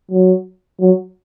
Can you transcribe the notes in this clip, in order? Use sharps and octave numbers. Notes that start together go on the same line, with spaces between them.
F#3
F#3